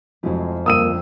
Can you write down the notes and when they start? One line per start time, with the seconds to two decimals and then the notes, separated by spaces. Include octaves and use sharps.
0.23 F2 C3 F#3 G#3 A3 E4
0.66 G1 C#2 G2 A#3 D#6 E6 D#7